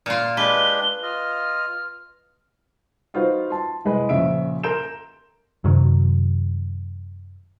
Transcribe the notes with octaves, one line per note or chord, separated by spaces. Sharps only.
A#2 F4
G#3 D4 G4 B4 G7
F4 D#5 F6
D#4 F4 F#4 B4 C5
A5 C6
C2 G#3 B4
A#1 C#3 C#4 E5 D7
A#4 A#5 C6 G6 D7 E7
F#2 C3 D#3 F#3